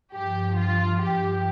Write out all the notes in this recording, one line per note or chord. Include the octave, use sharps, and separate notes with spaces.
G2 F3 G4
F4
G2 F3 G4